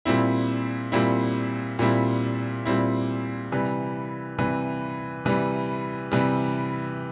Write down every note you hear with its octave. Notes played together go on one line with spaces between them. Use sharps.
A#2 G3 C4 E4
A#2 G3 C4 E4
A#2 G3 C4 E4
A#2 G3 C4 E4
C3 E3 G3
C3 E3 G3
C3 E3 G3
C3 E3 G3